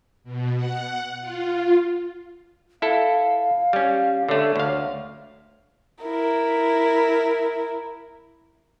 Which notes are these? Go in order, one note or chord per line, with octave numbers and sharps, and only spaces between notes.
B2
F#5
F4
E4 A4 F5
G3 C#4
D3 A3 C#5
D2 F5
E4 A#4